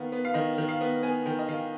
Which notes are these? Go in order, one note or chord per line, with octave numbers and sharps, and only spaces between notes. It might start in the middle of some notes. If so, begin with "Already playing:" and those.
Already playing: D#3 B3 F5
B3
F5
D#3 D#5
D#3
F5
B3
B3 G#5
D#3 G5
D#5
D#3 F5